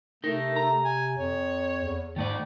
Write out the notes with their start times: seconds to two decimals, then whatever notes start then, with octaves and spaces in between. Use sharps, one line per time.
0.24 C3 A3 D#4 A#4
0.56 A#5
0.84 G#5
1.18 F2 C#5
1.84 E2
2.16 G#2 D#3 A3 D5